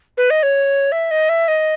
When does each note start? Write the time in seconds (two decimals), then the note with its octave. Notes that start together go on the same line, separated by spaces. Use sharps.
0.17 B4
0.30 D#5
0.43 C#5
0.92 E5
1.11 D#5
1.29 E5
1.48 D#5